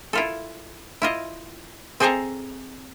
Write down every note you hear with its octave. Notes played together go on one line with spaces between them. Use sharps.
E4 F4 A4
E4 F4 D#5
C4 G#4 A4 D#5 G#5 A#5